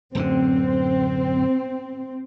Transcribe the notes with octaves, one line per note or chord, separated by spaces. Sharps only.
D1 F#2 D3 C4